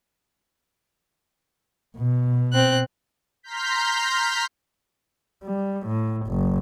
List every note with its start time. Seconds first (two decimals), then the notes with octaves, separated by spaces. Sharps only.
1.97 B2
2.53 C4 F#6
3.43 A#5 C6 F6 G6 B6
5.44 G3
5.87 A2
6.27 F#1